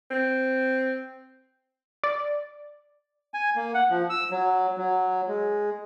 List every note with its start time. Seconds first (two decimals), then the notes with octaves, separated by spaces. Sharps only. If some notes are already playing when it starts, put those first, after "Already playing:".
0.10 C4
2.04 D5
3.34 G#5
3.56 A#3
3.74 F#5
3.90 F3
4.10 E6
4.31 F#3
4.77 F#3
5.28 G#3